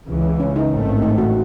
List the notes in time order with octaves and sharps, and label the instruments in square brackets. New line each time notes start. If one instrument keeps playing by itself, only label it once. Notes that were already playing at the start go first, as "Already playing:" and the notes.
[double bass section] C#2 C#3 E3
[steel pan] C#4
D#4
[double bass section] A1 G#2 D#3 A3 C4
[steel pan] D#4
F#4